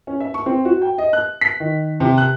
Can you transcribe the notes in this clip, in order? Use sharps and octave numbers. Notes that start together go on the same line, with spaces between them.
C#4
E5
C#6
C4
F#4
G5
D#5
F#6
B6
D#3
C3
F#6